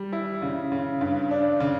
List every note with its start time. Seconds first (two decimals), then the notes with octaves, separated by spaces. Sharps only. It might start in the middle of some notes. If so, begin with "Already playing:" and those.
Already playing: G3
0.13 E4
0.42 C#3
0.72 C#3
1.01 G2
1.31 D4
1.60 C#3